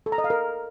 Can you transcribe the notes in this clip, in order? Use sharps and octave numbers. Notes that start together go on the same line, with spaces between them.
A4
A#5
D#5
F5
A#4